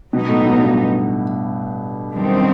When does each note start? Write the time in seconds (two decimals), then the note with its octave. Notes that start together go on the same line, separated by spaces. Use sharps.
0.12 B2 F#3 B3 D#4
0.29 A2
0.46 B2
0.63 G2
2.12 F#2 D#3 G3 C4